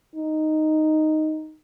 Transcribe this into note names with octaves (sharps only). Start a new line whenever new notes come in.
D#4